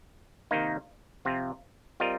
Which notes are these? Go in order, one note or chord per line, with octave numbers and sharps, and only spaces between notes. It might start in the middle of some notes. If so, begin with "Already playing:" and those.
C3 D#3 A#3 D#4
C3 F3 C4 F4
G3 C4 F4 A#4 D#5